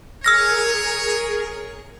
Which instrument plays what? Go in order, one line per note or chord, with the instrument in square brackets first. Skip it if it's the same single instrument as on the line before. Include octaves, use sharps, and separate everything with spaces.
[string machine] G#4 A#4 [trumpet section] C#5 [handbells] E6 F6 A#6